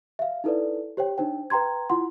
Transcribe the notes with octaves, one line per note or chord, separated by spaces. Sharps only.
E5 F5
D#4 E4 A4 B4 D5
G4 C5 C#5 G5
D4 D#4 C5 G5
B4 G5 A#5 C6 G#6
E4 F4 F#5 C6